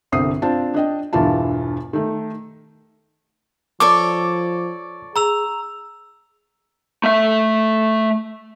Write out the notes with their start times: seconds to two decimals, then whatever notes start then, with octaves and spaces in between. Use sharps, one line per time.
0.12 G1 C2 D3 C4 D#6 C7
0.42 C4 D4 F4 A5
0.74 D4 D#5 G5
1.13 E1 G2 E3 E4 F4 A5
1.93 D#3 A3
3.80 F3 A4 C#5 D5 C#6 D6
5.16 G#4 A#5 E6 F7
7.04 A3 E5